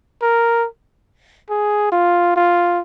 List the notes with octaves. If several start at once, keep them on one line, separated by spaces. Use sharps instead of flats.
A#4
G#4
F4
F4